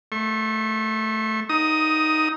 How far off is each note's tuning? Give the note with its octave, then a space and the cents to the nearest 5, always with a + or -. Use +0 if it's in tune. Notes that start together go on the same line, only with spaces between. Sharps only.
A3 +0 C#6 -45
D#4 +0 D#6 +15